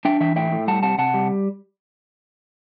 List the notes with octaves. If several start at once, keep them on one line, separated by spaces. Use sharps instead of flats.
D4 E5 G5
E3 E5 G5
A2 E5 G5
A2
G3 F#5 A5
C3 F#5 A5
C3 F#5 A5
G3